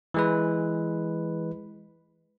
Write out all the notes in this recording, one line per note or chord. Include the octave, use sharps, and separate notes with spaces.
E3 G#3 B4